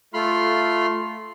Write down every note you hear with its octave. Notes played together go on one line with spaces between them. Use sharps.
A3 F4 B5 C6 F6